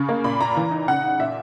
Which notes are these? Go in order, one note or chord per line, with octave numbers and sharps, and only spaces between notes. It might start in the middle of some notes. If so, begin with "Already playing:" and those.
Already playing: C#3 C#6
A#3
A#2 B5
A#2 A#5
E3
D#4
C#3 F#5
D#4
A#2 E5